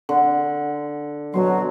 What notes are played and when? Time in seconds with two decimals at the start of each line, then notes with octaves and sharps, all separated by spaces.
0.09 D3
1.34 B2 F#3 C6